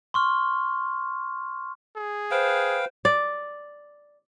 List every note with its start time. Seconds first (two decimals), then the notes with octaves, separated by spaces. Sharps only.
0.14 C6 C#6 F6
1.97 G#4
2.31 B4 C5 F5 G5
3.05 D5